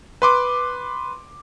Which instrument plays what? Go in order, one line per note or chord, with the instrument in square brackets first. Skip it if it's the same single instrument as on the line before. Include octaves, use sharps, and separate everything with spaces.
[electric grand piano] B4 C6 D6